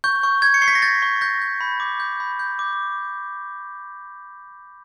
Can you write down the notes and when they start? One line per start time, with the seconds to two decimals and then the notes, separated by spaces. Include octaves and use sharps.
0.04 C#6 G6
0.23 C#6
0.42 C#6 G#6
0.54 C#7
0.62 C#6 C7
0.68 B6
0.75 A#6
0.82 G6 A6
1.02 C#6
1.21 G6 A#6
1.42 G6
1.61 B5
1.80 D6
2.00 G6
2.20 B5
2.39 G6
2.59 D6